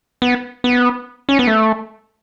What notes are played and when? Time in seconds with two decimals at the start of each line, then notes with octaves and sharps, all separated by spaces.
0.22 B3
0.64 B3
1.29 C#4
1.39 B3
1.47 A3